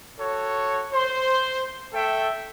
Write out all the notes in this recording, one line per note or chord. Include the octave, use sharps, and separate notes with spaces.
F#4 A4 C#5
C5 C6
A3 A4 E5 G5